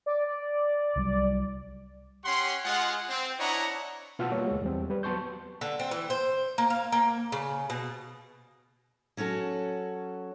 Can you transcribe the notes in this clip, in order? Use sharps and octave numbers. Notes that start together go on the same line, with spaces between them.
D5
C2 F#3 G3
C#4 G4 F#5 C6
G#3 F4 F#5
C4
D4 E4 C#5 D#5 F#5 A#5
B2 F4 F5 F#5 A5 E6
G3 A#3 B3 C#5
D2 G#3
E2 G3 C4
G3 B4
F#3 B3 A5 C6 C#6 G6
D3
C4
E3
C5
A#3
F5
A#3
C#3
B2
F#3 C#4 F#4 A4